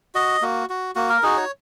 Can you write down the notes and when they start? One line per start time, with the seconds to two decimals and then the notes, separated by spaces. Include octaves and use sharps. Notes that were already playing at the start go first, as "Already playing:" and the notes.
0.15 F#4 D#5
0.42 A#3 F#4
0.70 F#4
0.95 A#3 F#4
1.09 A#4
1.23 D#4 F#4 G#4
1.37 C#5